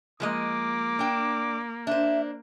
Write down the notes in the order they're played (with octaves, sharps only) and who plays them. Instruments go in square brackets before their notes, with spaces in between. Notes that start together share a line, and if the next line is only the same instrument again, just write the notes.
[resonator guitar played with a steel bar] F3 G#3 D#5 [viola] A#3 [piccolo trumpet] D6
[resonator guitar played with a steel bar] D4 G5
[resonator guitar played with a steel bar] D4 C5 [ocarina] E5